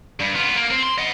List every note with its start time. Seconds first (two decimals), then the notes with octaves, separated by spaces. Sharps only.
0.20 G2
0.35 B3 F4
0.56 A#3
0.70 C4
0.83 C6
0.98 D#5 F#5